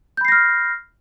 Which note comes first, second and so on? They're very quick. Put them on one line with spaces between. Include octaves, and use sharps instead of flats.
G6 B5 C7 A#6 F6